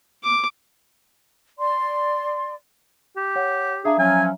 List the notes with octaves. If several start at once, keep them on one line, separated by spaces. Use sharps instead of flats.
D6
D5 C6
G4
C#5 F#5
D4 G#4 E5 F5 A#5
F3 F#3 C#4 G#5